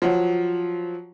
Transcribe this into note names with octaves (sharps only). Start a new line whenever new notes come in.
F3 F#3